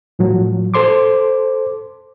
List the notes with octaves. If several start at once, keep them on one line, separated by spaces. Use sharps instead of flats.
A2 F3 F#3
A4 C5 C6 D6